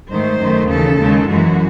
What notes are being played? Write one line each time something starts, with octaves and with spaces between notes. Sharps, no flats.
G#2 D#3 A3 C5
F#2 D#3 A3
D#2 C#3 E3 A4
D#2 C#3 G#3
F#2 E3 G#3 F#4